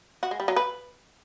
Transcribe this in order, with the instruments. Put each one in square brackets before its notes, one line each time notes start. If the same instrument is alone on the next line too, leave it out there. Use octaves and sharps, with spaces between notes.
[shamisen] F#4
G#3
G3
F#3
B4